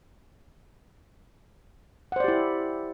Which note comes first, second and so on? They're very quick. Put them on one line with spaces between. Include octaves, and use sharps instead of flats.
F#5 C5 D5 G4 E4